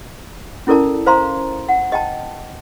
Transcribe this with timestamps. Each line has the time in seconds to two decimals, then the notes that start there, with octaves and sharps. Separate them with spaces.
0.67 C#4 E4 A4 A#4 D5 A5
1.06 C5 F5 A#5 C6
1.69 F#5
1.92 D#5 G5 A5